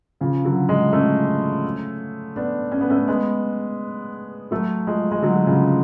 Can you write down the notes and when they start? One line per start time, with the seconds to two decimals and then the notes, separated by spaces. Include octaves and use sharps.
0.21 C#3 F3
0.45 D3 F#3
0.69 F3 G#3
0.92 A3 C#4
2.36 B3 D4
2.72 C#4
2.81 B3
2.90 A3 C#4
3.08 G#3 B3
4.51 F#3 A3
4.87 F3 G#3
5.11 G#3
5.22 D3 F#3
5.46 C#3 F3